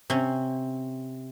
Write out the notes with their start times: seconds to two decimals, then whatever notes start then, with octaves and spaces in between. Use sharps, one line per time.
0.10 C3 C#4